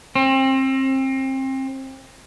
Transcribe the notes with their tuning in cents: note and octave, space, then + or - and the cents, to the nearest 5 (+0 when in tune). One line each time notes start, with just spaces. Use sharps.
C4 +30